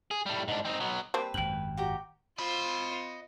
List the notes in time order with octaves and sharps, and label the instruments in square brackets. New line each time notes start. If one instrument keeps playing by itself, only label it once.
[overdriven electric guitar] G#4
A2 G3
G#2 D4
C4 D#4
F#3 B3
[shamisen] G3 A#3 C4 [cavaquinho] B4 [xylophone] A5
[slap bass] G#1 F#2 [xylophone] G5 F#7
[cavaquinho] F#4 G4 A#5
[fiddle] F4 C5 [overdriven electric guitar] D#5 B5